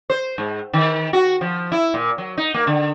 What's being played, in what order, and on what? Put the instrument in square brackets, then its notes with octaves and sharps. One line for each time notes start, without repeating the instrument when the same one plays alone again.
[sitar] C5
G#2
D#3
F#4
F3
E4
A#2
F#3
D#4
A#3
D3